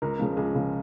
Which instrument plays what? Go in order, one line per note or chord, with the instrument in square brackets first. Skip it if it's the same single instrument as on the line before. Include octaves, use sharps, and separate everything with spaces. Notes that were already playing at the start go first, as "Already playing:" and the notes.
[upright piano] C#2 A#4
C#3 F3
C#2 G#4
C#3 F3